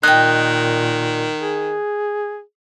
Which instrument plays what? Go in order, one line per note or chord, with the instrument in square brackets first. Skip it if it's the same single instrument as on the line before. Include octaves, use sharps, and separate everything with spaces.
[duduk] A#2 [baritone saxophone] D#3 [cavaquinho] D#5 G5 [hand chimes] F#6
[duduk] G#4